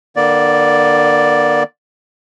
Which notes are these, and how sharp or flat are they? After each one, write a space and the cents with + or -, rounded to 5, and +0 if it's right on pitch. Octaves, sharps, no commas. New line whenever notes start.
D3 +45 A#3 +45 D5 +0